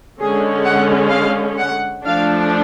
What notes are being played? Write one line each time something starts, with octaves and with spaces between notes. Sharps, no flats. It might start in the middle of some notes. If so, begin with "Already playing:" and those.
D3 G#3 C#4 G#4
F#5
F5
F#5
F3 A3 D4 F5